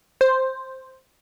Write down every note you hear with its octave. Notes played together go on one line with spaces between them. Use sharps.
C5